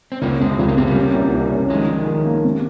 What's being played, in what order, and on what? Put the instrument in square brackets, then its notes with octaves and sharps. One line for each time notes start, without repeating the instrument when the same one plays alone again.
[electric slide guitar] C4
[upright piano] C#2 [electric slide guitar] A#3 C#4
[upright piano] C3 [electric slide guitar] G#3 C4
[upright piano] C#2 [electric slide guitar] F3 G#3
[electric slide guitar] G3 A#3
[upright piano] C3 [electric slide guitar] G#3 C4
[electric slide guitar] G3 A#3
[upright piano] C#4
C2
C2
C#4
[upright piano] D#3 [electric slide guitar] F3 G#3
[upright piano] D#3
D#3
A#3
C3